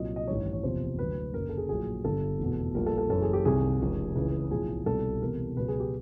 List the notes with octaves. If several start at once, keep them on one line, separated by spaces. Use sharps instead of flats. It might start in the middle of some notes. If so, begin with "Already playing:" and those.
Already playing: C2 A#2 F#3 D#5
D#5
A1 G2 D#3 C#5
C#5
F#1 E2 C3 F3 C5
D2 D3 F#3 B4
F#1 F#2 D3 A#4
A4
G#4
A#1 A2 F#3 G#4
G1 G2 D3 G3 A4
F1 E2 B2
A#1 A#2 G3 A#4
A4
A4
F#1 F#2 C#3 E3 A4
G#4
G4
C2 C3 D#3 G3 G#4
F1 F2 C#3
C#2 C#3 E3
B1 A2 F3 G#4
C2 B2 G3 A4
E1 E2 C3 A#4
C#2 B2 F#3 B4
G#4
G4